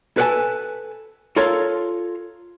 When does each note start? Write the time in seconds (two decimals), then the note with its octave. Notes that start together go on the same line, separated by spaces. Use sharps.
0.17 A4 B4 C#5 F#5 G#5 A5
1.36 F4 A4 A#4 C#5 F5